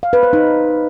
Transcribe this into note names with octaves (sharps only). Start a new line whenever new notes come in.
F5
B4
C5
D#4